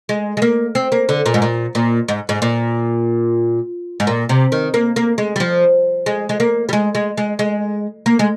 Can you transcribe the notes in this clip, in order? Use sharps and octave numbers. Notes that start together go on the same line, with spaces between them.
G#3
G#3
A#3
C4
A#3
D3
A#2
G#2
A#2
A#2
G#2
G#2
A#2
G#2
A#2
C3
D#3
A#3
A#3
G#3
G3
F3
G#3
G#3
A#3
G3
G#3
G#3
G#3
G#3
A#3
G#3